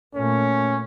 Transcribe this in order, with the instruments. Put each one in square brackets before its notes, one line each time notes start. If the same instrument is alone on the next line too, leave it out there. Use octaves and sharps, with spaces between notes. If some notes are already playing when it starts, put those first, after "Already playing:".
[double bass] A#2 A3 [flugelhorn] C#4